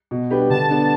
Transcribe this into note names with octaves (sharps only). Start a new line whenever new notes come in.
B2
G3 D4 G4 B4
D3 A5
B3 D4